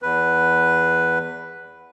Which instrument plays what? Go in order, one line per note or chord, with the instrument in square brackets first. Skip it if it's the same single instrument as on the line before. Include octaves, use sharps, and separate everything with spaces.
[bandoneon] E2 B4